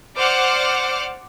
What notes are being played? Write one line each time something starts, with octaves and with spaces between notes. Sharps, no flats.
C5 D5 F#5 D6 F6